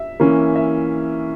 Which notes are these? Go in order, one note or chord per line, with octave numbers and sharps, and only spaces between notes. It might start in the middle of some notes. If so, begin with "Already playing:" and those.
Already playing: E5
E3 A#3 C#4
E5